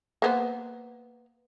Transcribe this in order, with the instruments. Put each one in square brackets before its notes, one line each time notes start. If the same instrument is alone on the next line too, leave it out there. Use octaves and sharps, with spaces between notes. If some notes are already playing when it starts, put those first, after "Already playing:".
[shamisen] A#3 B3 C5